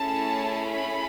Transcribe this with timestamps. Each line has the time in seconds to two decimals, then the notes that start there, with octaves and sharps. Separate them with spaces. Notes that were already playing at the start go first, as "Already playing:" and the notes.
Already playing: A3 C#4 E4 G#4 A5
0.65 B5